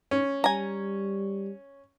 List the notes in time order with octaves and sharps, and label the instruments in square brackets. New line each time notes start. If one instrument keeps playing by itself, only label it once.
[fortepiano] C#4
[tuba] G3 [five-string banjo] G#5 A#5